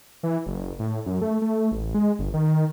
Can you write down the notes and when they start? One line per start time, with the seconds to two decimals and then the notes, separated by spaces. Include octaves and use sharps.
0.23 E3
0.46 F#1
0.79 A2
1.06 F#2
1.21 A3
1.42 A3
1.72 A1
1.94 G#3
2.19 G1
2.34 D#3